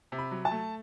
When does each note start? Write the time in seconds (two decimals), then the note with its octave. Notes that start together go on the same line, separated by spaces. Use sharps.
0.12 C3
0.18 B5
0.31 F#3
0.45 A5
0.51 A3